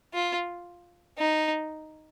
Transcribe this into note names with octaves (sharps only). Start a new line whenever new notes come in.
F4
D#4